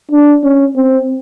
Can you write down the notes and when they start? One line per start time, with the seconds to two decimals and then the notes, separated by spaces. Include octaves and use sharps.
0.11 D4
0.43 C#4
0.76 C4